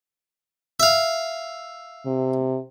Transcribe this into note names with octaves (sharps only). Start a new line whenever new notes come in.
E5 F5
C3